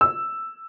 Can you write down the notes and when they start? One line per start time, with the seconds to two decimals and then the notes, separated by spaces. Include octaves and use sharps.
0.01 E6